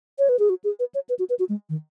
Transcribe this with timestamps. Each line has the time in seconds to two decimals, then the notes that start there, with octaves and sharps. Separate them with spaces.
0.19 C#5
0.29 B4
0.39 G#4
0.50 F#4
0.64 G#4
0.79 B4
0.95 C#5
1.09 B4
1.19 F#4
1.30 B4
1.39 F#4
1.49 G#3
1.69 D#3